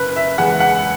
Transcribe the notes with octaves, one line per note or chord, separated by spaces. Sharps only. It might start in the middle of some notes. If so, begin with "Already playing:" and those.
Already playing: F#1 B4
E5
E2 E3 G#3 F#5
F#5